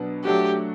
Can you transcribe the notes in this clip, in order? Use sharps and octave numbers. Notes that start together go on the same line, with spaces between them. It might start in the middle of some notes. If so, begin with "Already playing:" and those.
Already playing: B2 F#3 B3 D4
F#3 A3 D4 F#4 G4